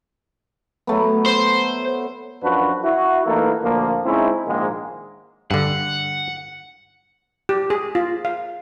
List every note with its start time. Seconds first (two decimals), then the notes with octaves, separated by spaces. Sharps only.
0.87 F#3 A3 B3
1.26 C5
2.43 F#2 F3 D4 F#4 B4
2.84 E4 F#4
3.26 E3 A3 A#3 D#4 A4 B4
3.63 D2 A#2 F3 A#3
4.05 G#3 C4 C#4 D#4 E4
4.47 A#1 G#2 D#3 G#3 A#3
5.51 G2 D3 F#5
7.49 G4
7.70 G#4
7.95 F4
8.25 F5